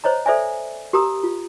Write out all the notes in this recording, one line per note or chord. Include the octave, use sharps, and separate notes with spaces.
C5 C#5 D#5 A#5
A4 C5 D5 E5 F5 G#5
G4 A#4 A#5 D#6
F4